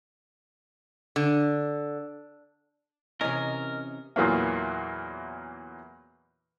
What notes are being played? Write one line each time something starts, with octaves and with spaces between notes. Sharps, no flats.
D3
C3 E3 C#4 A#4 D#5 G#6
E2 A#2 E3 F#3 A#3